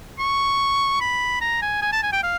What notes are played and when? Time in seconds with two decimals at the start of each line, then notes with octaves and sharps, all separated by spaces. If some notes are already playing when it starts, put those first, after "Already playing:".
0.19 C#6
1.01 B5
1.41 A#5
1.62 G#5
1.82 G#5
1.92 A5
2.03 G#5
2.13 G5
2.23 F5